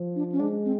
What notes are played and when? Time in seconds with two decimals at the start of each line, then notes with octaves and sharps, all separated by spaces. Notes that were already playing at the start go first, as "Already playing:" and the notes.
Already playing: F3
0.16 D4
0.32 C#4
0.40 G#3 D4
0.65 C4